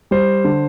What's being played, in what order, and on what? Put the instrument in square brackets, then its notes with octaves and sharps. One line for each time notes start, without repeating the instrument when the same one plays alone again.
[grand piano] G3 C5
D3